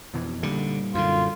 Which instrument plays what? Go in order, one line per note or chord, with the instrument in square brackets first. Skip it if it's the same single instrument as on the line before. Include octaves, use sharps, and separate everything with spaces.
[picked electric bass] F2 B2 E3
[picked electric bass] A#2 G3 [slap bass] D3
[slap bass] F#2 D3 [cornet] F4